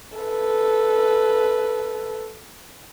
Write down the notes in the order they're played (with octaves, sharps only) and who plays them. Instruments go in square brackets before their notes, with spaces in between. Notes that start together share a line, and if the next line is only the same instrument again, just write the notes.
[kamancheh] A4 B4